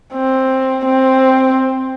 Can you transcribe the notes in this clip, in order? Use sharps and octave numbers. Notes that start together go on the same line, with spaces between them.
C4
C4